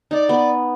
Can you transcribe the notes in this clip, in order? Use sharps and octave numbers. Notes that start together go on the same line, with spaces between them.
D#4 D5
B3